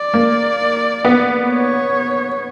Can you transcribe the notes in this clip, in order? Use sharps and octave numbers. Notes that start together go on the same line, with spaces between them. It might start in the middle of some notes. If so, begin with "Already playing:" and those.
Already playing: D5
A#3
B3
C#5